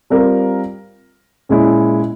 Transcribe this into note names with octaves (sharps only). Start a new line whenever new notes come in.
G3 C4 F4 A#4
A#2 G#3 C#4 E4